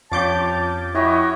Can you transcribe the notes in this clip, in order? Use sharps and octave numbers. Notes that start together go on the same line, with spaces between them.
F2 F3 C#4 G4 A5 D6 G6
E4 F#4 G4 C#5 D#5